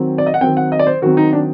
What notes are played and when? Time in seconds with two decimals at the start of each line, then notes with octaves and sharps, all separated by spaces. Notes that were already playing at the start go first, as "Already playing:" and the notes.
Already playing: D#3 F#3 C4
0.18 D5
0.26 D#5
0.34 F#5
0.41 D#3 F#3 C4 G5
0.57 F#5
0.72 D#5
0.79 D5
0.87 C5
1.02 D#3 F#3 C4 F#4
1.17 D#4
1.33 D4